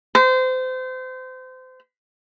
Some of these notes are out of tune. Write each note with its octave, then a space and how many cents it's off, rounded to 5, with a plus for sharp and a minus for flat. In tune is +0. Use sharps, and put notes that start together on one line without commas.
C5 -30